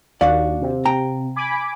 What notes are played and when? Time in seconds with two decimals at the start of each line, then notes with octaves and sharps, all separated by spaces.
0.21 D#2 D4 F#4 D5 F5
0.61 C3
0.85 G5 A#5
1.36 G#5 B5 D6